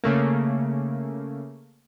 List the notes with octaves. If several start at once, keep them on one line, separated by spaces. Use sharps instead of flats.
C#3 A3 A#3